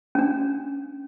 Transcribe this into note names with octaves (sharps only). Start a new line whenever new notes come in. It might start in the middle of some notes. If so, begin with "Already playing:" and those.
C#4 D4